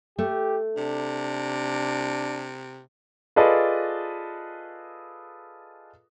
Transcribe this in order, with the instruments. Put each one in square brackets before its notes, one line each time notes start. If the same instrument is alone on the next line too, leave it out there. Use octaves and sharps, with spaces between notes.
[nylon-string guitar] A3 [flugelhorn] G4
[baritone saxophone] C3 [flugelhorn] D4
[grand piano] F4 G#4 A4 B4 D5 D#5